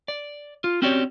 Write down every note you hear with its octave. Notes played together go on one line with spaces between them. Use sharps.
D5
F4
C4 C#4 F#4 G4 C#5 D5